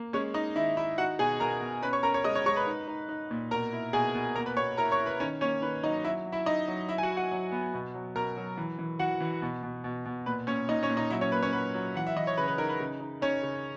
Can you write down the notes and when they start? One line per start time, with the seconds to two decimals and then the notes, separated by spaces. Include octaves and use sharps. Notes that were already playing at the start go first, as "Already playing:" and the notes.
Already playing: A#3
0.13 G#3 C#4 C#5
0.34 D#4 D#5
0.56 D#3 E4 E5
0.77 D#4 E4 E5
0.98 D#4 F#4 F#5
1.19 B2 G#4 G#5
1.40 B2 A#4 A#5
1.61 B2
1.83 C#4 B4 B5
1.93 C#5 C#6
2.03 C#4 A#4 A#5
2.14 C#5 C#6
2.24 G#3 D#5 D#6
2.35 C#5 C#6
2.46 G#3 C#5 C#6
2.56 B4 B5
2.67 D#4
2.88 D#4
3.09 D#4
3.31 A#2
3.51 B2 A#4 A#5
3.73 E4
3.93 B2 G#4 G#5
4.15 B2
4.35 A#3 A#4 A#5
4.46 B4 B5
4.57 B2 C#5 C#6
4.77 E4 A#4 A#5
4.92 C#5 C#6
4.99 E4
5.06 B4 B5
5.20 D#3 C#4 C#5
5.41 A#3 C#4 C#5
5.62 D#3 B4
5.83 F#3 D#4 D#5
6.04 F#3 E4 E5
6.25 F#3
6.32 E4 E5
6.46 D#4 D#5
6.68 F#3
6.89 E4 E5
6.98 G#5
7.03 F#4 F#5
7.10 E4
7.17 F#4 F#5
7.31 F#3
7.52 B3
7.74 B2
7.94 F#3
8.15 B2 A#4 A#5
8.37 F#3
8.57 E3
8.79 E3
8.99 E3 F#4 F#5
9.20 E3
9.42 B2
9.63 B2
9.84 B2
10.05 B2
10.26 A#2 B4
10.47 A#2 C#4 C#5
10.69 A#2 D#4 D#5
10.83 C#4 C#5
10.89 A#2
10.97 D#4 D#5
11.10 F#3 E4 E5
11.21 C#4 C#5
11.32 A#3 B4
11.42 C#4 C#5
11.53 F#3 B4
11.74 F#3
11.95 E3 F#5
12.07 E5
12.17 E3 D#5
12.27 C#5
12.37 C#3 B4
12.48 B4
12.58 D#4 A#4
12.69 B4
12.80 C#3
13.00 D#4
13.21 C#4 D#4 C#5
13.43 C#3